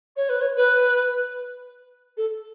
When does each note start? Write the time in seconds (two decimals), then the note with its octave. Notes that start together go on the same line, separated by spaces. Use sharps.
0.16 C#5
0.29 B4
0.41 C#5
0.57 B4
2.17 A4